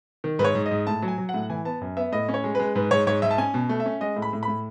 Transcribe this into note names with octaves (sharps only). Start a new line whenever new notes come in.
D#3
G#2 B4
C#5
G#2
D#5
G#2
A2 A5
F#3
G#5
F#3
F#5
A2
E3 G#5
B3 A5
F#2
B3 E5
A2 D#5
C#4
C#5
G#3
G#3 B4
G#2 B4
G#2 C#5
G#2 C#5
G#2 E5
A5
C#4 G#5
B2
A3
E5
C#4
G#3 D#5
A2
B5
A2
B5
A2